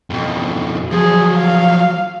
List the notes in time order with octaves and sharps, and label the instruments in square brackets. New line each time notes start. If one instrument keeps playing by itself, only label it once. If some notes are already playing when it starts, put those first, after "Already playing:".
[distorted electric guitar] F2 B2
[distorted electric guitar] F3 F#3 [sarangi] G#4
[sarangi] F5